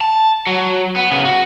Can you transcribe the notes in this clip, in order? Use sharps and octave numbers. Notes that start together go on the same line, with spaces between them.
A5
F#3
B3
C#3 B3
F#4